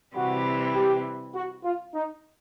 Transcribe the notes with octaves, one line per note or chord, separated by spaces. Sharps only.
C3 E3 G3 F#4
G4
F#4
F4
D#4